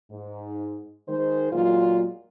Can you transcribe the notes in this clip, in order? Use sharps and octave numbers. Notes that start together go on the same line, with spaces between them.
G#2
D#3 G#3 C5
E2 A#2 F#3 G#3 F4